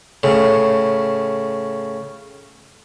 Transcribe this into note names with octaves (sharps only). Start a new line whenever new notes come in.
A2 C#3